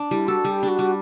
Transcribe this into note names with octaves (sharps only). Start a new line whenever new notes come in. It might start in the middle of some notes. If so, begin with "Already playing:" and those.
Already playing: D4
G3 E4
F#4 A4
G3 G4
D4
F#4
G3